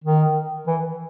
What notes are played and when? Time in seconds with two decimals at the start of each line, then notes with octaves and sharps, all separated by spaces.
0.04 D#3
0.67 E3